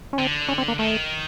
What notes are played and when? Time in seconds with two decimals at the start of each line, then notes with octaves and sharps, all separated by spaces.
0.13 C#4
0.18 D3 C4
0.48 C#4
0.58 C4
0.68 A#3
0.79 D#3 A3